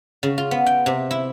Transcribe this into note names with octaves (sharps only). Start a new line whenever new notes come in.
C#3
F4
B3
G5
C3
E4